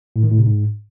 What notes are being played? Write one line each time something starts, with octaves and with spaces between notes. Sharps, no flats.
A2
D#3
A2
C3
G#2